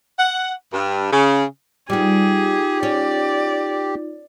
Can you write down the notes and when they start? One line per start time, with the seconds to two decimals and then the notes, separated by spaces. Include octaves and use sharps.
0.19 F#5
0.73 G2
1.12 C#3
1.90 G3 B3 D#4 F4 G4 G#4
2.83 C#4 D5